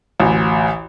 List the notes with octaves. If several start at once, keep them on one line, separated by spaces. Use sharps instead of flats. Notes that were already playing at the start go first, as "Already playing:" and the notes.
A1 D2